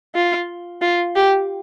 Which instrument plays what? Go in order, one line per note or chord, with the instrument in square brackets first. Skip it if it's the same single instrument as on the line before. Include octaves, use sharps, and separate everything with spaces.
[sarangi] F4
F4
G4